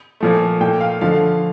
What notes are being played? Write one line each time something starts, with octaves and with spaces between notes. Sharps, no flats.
A#2 F3 A3
A#2 A3 G5
F5
D3 F3 A3 F5